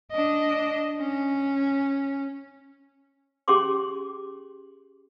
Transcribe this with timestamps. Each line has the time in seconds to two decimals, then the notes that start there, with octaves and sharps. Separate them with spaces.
0.11 D4 D#5
1.00 C#4
3.48 C#4 G4 G#4 C6 D6